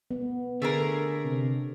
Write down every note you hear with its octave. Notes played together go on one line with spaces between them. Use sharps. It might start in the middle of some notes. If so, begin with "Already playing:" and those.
B3
D3 A3 G#4 A#4
C3